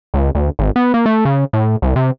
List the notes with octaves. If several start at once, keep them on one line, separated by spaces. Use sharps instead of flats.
C#2
D2
G#1
B3
A#3
A3
C#3
A2
C2
C3